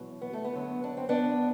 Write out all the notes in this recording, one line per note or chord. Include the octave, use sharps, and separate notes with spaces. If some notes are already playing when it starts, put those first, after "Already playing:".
Already playing: E2 B2 F#3
B3
A3
B3
F#2 D3 F#3
D4
C4
B3 D4